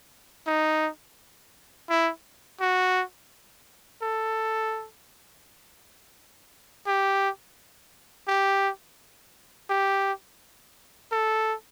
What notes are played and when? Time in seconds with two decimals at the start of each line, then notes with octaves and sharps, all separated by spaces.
0.47 D#4
1.89 E4
2.61 F#4
4.02 A4
6.87 G4
8.28 G4
9.70 G4
11.12 A4